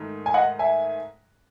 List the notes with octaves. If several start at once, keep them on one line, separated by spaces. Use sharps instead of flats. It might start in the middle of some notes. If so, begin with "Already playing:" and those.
Already playing: G#2 D#3 A3
G#5
D#5 F#5
E5 G#5